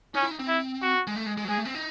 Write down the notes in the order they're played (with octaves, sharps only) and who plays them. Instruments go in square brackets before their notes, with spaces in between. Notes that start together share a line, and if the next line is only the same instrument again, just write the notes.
[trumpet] C#4 [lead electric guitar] D#4
[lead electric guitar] E4
D#4
C4
[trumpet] E4
F#4
[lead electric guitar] G#3
A3
G#3
G#3
F#3
[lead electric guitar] G#3 [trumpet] G#4
[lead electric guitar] A3
C4
D#4